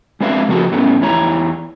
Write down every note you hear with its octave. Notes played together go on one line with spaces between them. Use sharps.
G#3 C4 D4 B4 E5 F5
C#3 F3 A#3 F#4 G#4 A4
A2 A3 B3 C#4
E2 E4 C#5 A#5